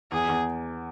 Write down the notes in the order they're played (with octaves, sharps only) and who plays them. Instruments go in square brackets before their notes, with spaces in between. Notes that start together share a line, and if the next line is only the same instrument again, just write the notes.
[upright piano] E2 [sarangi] G#4
[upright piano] E2